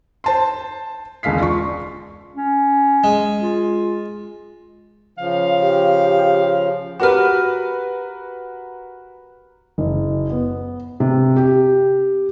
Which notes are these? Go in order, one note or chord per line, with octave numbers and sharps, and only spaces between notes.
C5 A5 C6
E1 C#2 G#3 F5 B6 C7
F4 D5 C#6
C#4
G#3
F4
C#3 F3 F5
G4
F#4 G4 A#4 B4 F6
F#1
B3
C3
G4